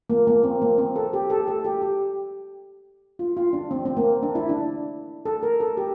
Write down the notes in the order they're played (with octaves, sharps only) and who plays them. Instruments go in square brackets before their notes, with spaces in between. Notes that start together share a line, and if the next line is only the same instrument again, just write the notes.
[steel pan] A#3
A#3
C4
A#3
C4
A4
G4
A4
A4
G4
G4
F4
F4
D4
C4
C4
A#3
D4
E4
D4
A4
A#4
A4
G4